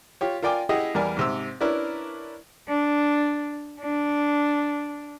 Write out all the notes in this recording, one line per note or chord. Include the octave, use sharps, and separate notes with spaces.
F4 G4 C#5
F4 A#4 D5 G5 G#5 D6
E4 G4 G#4 D#5 F#5
E2 G3 A#4 D5 G#5
G#2 C3 E6
C#4 D4 E4 A#4 B4 D5
D4
D4